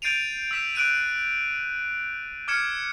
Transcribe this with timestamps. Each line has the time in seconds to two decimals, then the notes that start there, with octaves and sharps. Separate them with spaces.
0.02 G6 A6 C7 D7 D#7 F7
0.51 E6 B6 E7
0.75 E6 F#6 D7 D#7
2.48 D6 F6 G#6 C#7 E7